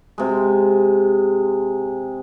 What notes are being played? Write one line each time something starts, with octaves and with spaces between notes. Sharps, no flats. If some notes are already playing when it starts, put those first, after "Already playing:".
C3 G#3